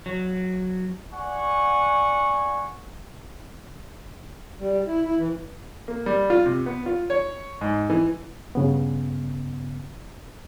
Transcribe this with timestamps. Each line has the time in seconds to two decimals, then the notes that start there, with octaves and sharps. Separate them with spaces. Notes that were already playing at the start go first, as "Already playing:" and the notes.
0.06 F#3
1.13 D5 F#5 G#5 C#6
4.59 G3
4.87 E4
5.03 E4
5.18 E3
5.88 A#3
6.06 G3
6.30 F4
6.46 C3
6.66 B3
6.86 F4
7.10 C#5
7.61 G#2
7.90 E3
8.55 G2 C#3 B3